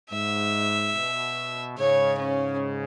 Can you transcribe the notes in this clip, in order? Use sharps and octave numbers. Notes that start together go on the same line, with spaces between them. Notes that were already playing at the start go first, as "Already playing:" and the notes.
G#2 E5
B2
G#2 C#3 C#5
C#4